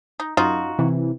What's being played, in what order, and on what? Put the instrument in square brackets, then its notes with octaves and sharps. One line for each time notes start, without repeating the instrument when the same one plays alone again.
[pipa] D#4
[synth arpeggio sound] F#2 [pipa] D#4 F4 F#4
[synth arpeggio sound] C3 E3